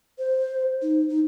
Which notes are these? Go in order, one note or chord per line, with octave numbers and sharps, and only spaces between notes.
C5
D#4
D#4